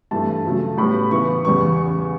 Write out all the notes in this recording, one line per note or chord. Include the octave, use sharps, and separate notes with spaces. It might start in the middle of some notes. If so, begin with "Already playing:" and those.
G2 E3 A3 A5
C#3 F#3 A3
A2 G3 B3 B5
C#3 E3 B3 C#6
E2 C#3 G3 B3 C#6